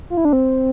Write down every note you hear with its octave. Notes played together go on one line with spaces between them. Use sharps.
F4
E4
D4
C4